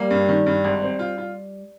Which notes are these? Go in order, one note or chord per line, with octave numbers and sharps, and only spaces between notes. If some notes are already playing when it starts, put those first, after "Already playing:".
Already playing: G3 A#3
G2
D#3
G2
G#1
C4
F4
F4